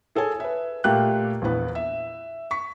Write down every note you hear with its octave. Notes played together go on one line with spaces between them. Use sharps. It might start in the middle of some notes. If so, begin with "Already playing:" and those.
G#4 A4 C#5 G#5
B4 E5
A#2 A3 A#3 G4 G5 F#6
A#1 E2 E3 B3 B4
E5
C#6 B6